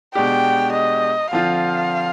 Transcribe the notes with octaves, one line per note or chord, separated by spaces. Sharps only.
B2 G#3 D4 G4 G5
D#5
D3 F3 C4 F4 F5